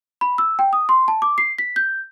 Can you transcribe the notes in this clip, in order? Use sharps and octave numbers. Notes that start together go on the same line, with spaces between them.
B5
E6
G5
D#6
C6
A5
D6
C7
B6
G6